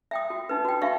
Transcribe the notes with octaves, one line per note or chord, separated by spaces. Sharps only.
E5 G5 D#6
F#4
D4 D#4 B4
F#4 G5
D4 D#4 F#4 E5 F5 C#6